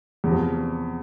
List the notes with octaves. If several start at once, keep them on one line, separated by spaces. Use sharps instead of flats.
E2 C3 F3